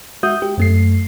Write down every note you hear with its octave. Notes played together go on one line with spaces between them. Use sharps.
G#3 F#4 E5 D#6 G6
G4
F#2 A3 C7